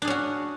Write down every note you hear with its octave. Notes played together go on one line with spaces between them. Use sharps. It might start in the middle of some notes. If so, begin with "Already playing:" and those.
C#4 D4 F#4 G#4